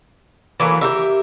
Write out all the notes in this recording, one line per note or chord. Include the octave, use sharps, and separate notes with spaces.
E3 F#3 A3 A#3
G4 A#4 E5